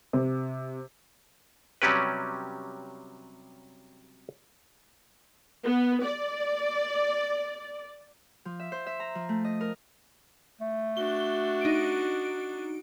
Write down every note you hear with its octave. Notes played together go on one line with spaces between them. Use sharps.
C3
C3 F#3 G3 C#4 G4 B4
B3
D5
F3
E5
C5
E5
A#5
F3
A3
D#5
A#4
A3
D4 F#4 G7
D#4 D7